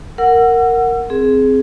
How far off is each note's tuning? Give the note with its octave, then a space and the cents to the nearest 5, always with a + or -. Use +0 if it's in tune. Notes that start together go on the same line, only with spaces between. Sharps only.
A#4 -10 F#5 +0 E6 +35
C4 +0 G#4 +10